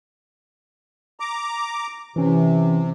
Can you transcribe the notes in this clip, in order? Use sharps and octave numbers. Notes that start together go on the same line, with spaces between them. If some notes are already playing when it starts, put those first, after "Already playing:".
A#5 D6
C3 E3 C#4